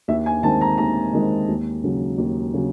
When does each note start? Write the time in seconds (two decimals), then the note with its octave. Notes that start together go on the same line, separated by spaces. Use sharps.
0.08 D#2 E5
0.26 G#5
0.43 D#3 G#3 C4 A5
0.61 A#5
0.78 D#2 A#5
1.13 D#3 G#3 C4
1.48 D#2
1.84 C#3 F#3
2.18 D#2
2.54 C#3 F#3